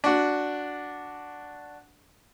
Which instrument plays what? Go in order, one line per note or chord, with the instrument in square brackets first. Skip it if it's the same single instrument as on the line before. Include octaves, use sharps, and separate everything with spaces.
[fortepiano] D4 F#4